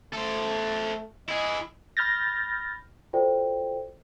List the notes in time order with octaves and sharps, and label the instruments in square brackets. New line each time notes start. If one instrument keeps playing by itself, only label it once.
[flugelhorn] A3 [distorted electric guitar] A4 C5
[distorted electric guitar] E4 G#4 [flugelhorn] D#5
[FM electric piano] B5 F6 G6 A6 A#6
[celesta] F4 F#4 A4 C5 D5 G5